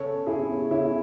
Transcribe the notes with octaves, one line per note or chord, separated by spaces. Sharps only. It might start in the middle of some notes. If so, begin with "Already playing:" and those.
Already playing: C#3 A4 C#5
C#3 E4 G#4
C#3 C#4 E4